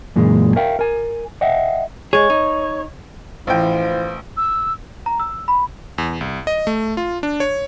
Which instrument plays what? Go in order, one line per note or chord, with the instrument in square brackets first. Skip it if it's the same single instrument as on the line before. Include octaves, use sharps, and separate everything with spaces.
[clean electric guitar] F#2 A#2 E3 G#3
A#4 E5 F5 G5
A#4 G#5
D#5 E5 F#5 G5
[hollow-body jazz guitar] G#3 G#4 [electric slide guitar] C#5
[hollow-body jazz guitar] D#4
[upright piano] A1 G5 [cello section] E3 [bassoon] F3
[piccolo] E6
[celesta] A#5
E6
B5
[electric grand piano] E2
C2
D#5
A3
F4
D4
C#5